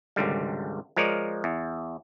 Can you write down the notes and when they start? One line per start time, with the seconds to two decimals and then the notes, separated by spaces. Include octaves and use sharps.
0.16 G#1 C#2 D3 G3
0.96 F3 G#3 A#4 C#5 D5
1.44 E2